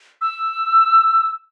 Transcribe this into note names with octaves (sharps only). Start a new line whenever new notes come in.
E6